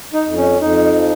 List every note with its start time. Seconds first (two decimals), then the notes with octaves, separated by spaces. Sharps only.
0.13 D#4
0.26 F2
0.37 C#4
0.61 F2 D#4
0.96 F3